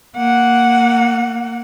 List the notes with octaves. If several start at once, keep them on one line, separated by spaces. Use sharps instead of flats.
A#3 F#5